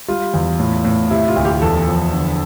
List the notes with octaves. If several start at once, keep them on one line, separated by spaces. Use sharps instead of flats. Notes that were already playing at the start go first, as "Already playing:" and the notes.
G3 F4
E2
A2
A2
C3 E4
F4
D2
G4
E2 A4
F3
D3